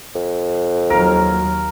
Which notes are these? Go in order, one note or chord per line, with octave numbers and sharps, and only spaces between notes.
F2
D#2 F#3 A#4 F5